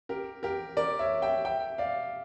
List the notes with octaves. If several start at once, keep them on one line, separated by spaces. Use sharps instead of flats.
G4 A#4
G4 A#4
A#4 D5
C#5 E5
E5 G5
E5 G5
D5 F5